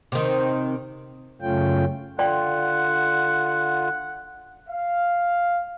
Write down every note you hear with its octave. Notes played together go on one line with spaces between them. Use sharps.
C3 D#3
F#2 C#3 A3 C#4 F4 G5
D3 F4 D5 F#5 G5 C6
F5